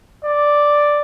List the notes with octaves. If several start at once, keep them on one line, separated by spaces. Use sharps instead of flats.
D5